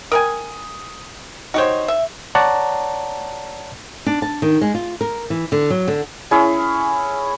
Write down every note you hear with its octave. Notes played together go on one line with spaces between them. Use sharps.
A#4 G5 G#5 D#6
D#4 F#4 G4 C5 C#5
E5
C#5 D5 F#5 A5 A#5
D4
A5
D#3
G#3
F4
A#4
E3
D3
F#3
D3
C#4 E4 G#4